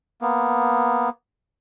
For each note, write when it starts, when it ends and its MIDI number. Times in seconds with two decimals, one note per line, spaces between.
0.21 1.09 58
0.21 1.09 59